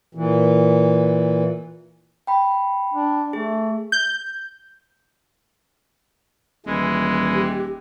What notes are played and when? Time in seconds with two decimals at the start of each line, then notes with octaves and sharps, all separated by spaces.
0.15 A#2 E3
2.27 G5 B5
2.94 D4
3.33 A3 G#4
3.92 G6
6.66 D#1 E3 G#3
7.34 G4